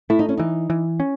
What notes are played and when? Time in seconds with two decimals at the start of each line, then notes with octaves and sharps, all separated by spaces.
0.10 A3 E4
0.19 D#4
0.29 C#4
0.37 E3 D#4
0.70 E3
1.00 C#4